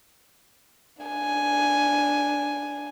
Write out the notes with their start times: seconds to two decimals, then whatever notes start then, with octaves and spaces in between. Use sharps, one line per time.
1.03 D4 G#5